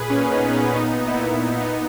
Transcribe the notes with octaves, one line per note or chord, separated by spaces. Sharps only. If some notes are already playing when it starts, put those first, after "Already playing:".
Already playing: A#2 G#4 B4
A#2 C#4
A#2 B3 D#4
B3
A#2 C#4
A#2 B3 D#4
A#2
E4
A#2 B3 D#4
A#2
A#2 B3 D#4